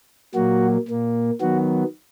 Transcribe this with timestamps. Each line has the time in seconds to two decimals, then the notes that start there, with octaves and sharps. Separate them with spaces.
0.35 A#2 F#3 A#3 F#4
0.88 A#2 A#3
1.41 D#3 F#3 B3 F#4